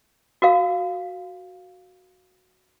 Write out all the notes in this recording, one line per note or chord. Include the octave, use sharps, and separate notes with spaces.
F#4 A#4 F5